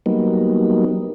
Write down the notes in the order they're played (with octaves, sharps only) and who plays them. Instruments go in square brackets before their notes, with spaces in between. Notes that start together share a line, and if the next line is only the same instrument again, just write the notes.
[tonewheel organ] F#3 G3 A#3 B3 D#4